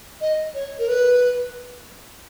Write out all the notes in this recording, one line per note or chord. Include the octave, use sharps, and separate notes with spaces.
D#5
C#5
A#4
B4